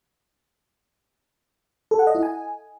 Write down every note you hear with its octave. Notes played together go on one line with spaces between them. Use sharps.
A4
F#5
D#5
E4
G#5